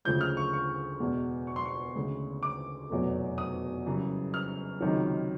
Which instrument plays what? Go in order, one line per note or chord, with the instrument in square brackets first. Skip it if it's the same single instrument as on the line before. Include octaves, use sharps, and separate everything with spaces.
[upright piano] D2 C#3 F3 G#3 G6
F6
C#6
C#6
E2 B2 G#3
C#6
C6
C#6
D2 C#3 E3 G#3
D6
F1 E2 B2 F#3
D#6
F#2 C#3 E3 G3
F6
C#2 C3 D#3 F#3